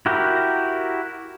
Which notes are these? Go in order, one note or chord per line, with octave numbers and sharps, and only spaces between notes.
E4 F#4 G4 A#4